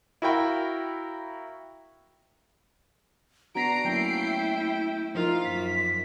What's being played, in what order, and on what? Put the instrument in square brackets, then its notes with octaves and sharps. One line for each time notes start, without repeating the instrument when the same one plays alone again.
[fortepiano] E4 F#4 A#4 F5 G5 B5
[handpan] B3 D4 F#4 [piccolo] A#5 [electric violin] C7 D7
[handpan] F#3 A#3 C#4 [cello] A3 E4 [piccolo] G5
[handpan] F3 D#4 A#4 [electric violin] F4 F5
[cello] F#2 [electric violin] F4 [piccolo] B6